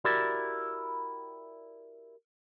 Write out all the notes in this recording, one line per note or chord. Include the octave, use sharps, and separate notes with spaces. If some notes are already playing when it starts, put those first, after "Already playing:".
E4 F#4 G4 A#4 D5